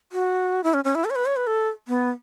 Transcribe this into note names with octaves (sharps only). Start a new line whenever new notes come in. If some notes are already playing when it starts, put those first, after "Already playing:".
F#4
E4
C#4
C#4
E4
A4
C#5
B4
C#5
B4
A4
B3